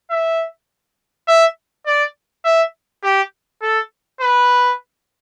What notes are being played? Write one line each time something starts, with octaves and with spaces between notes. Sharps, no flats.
E5
E5
D5
E5
G4
A4
B4